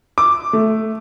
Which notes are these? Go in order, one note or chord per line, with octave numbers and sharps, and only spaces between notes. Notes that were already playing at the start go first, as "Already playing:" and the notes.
D6
A3